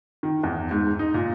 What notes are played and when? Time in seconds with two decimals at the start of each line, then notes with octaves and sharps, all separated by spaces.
0.23 D#3
0.43 E2
0.71 G#2
0.99 D#4
1.14 A#2